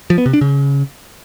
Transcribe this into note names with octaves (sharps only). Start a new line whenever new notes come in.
F3
B3
C3
D4
C#3